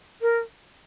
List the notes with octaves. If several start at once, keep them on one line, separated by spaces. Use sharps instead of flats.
A#4